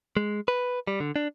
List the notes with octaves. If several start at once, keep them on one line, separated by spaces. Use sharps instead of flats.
G#3
B4
G3
D3
D4